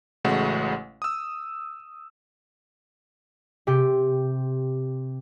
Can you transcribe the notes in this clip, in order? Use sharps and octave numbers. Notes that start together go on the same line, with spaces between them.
A1 C#3 G#3 A3 F#4 F#5
D#6 E6
C3 G4